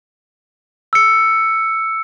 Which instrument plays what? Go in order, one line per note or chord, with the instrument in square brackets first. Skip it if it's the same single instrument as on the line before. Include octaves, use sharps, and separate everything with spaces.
[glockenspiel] E6 C#7